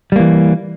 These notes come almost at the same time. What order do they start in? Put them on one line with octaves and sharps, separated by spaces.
G3 A#3 E3